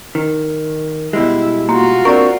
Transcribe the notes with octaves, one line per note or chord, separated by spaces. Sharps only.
D#3
B2 G3 G#3 E4
A#3 F4 F#4 C6
C4 D4 A#4 D5 C#6